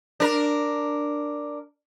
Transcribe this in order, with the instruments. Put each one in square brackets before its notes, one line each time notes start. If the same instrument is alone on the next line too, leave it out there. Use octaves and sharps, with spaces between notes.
[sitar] D4 A#4